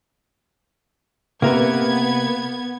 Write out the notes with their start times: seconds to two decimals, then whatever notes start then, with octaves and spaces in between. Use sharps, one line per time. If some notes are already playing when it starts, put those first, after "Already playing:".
1.42 C3 A#3 B3 A#4 B4 G#6